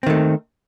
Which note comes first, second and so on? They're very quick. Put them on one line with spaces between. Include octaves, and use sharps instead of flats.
C4 D#3 A3